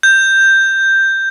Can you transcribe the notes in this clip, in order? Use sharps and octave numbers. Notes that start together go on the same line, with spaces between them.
G6